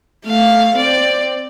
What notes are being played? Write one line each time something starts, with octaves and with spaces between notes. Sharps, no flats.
A3 F5
C4 D5